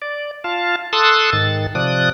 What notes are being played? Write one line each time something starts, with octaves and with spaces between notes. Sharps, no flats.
D5
F4 F5 A5
A4 A5 C6 D#6 E6 F#6
G#2 D#3 A6
C3 F3 D5 D#6 F#6